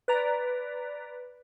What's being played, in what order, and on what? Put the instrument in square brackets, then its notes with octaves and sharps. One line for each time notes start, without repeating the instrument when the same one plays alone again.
[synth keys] B4 D5 A#5